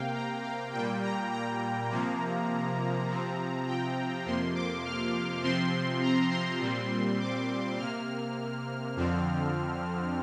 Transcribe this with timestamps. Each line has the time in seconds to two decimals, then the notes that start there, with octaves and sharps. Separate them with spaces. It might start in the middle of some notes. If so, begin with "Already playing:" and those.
Already playing: C3 A#3 F5 G5
0.14 A#5
0.44 F5
0.73 A#2 G3 A#3 G5
1.02 A#5
1.32 A#5
1.91 C3 F3 A#3
3.08 C3 F3 C4
3.67 G5
4.25 F2 C3 F3 A#3 C6
4.55 D6
4.85 F6
5.43 C3 F3 C4 C6
6.02 A#5
6.31 C6
6.60 A#2 G3 C4
7.20 D6
7.78 C3 A#3 F6
8.96 F2 D3 F3 C4